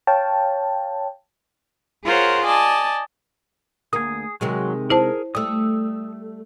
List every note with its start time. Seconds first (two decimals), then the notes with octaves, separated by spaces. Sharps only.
0.07 C#5 F5 G5 A5
2.04 F4 G#4 A#4 C5 C#5 F#5
2.43 D5 D#5 G#5 A5
3.93 D2 A#3 G#4 D#6
4.41 C3 D#3 F#3 G#3
4.90 E4 G#4 A#4 C5 A5
5.35 G3 A3 D#6 E6